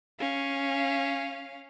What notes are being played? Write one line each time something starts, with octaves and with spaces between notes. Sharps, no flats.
C#4 F5